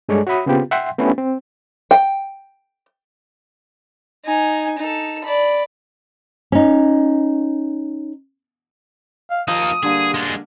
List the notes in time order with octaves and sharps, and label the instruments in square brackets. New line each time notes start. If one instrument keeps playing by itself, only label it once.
[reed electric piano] G2 G#3 A4 C#5 D5
F#4 C#5 E5 B5 D#6
C#3 B3 C4 F4 G4
E5 F#5 G5 C6
A3 B3 C#4 D4 E4 G4
C4
[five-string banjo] G5
[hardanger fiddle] D#4 G#5
D#4 A4
D5 B5
[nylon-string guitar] C#4 D#4
[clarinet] F5
[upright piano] F3 [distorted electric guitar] A#3 D#4 [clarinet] D#6
[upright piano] D3 G3 A#3 [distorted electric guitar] G#4
[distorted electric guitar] G#3 D4